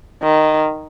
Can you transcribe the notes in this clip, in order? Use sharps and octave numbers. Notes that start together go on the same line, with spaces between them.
D#3